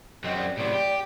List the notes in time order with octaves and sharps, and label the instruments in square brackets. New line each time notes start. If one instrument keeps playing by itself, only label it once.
[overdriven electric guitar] F#2 C4 [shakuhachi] D#5
[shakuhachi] D5
[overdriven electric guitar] A2 C3 [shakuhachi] D5
[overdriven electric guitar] G4